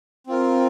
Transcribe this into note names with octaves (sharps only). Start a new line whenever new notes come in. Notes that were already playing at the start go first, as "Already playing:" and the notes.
C4 F4 A#4